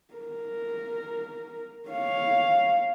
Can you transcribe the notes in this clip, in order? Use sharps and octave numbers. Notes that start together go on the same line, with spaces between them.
A#4
C#5 F5